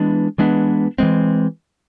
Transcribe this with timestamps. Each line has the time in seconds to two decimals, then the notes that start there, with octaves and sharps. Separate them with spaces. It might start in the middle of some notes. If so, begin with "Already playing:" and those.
Already playing: E3 G#3 B3 D4
0.38 E3 G#3 B3 D4
0.98 E3 G#3 C4